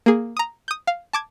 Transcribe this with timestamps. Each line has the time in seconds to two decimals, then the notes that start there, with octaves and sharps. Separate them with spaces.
0.06 A#3 G#4
0.37 A#5 D#6
0.68 D#6 G6
0.87 F5
1.13 A5 D6 G#6